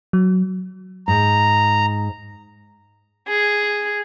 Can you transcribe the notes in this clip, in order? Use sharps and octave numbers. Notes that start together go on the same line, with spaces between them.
F#3
G#2 A#5
G#4